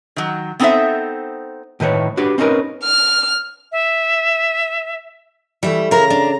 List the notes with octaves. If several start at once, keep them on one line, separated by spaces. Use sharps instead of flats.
D#3 F#3
B3 C4 D#4 A4 C5 E5
A2 D#3 B4 C#5
D4 F#4 G4 B4
C4 C#4 D#4 F4 A#4 B4
F6
E5
E3 G3 A3 E5
C#3 E4 A#4 A#5
D4